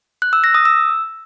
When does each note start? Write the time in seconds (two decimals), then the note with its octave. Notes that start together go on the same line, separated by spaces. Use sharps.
0.22 F#6
0.33 E6
0.44 A#6
0.55 D#6
0.65 E6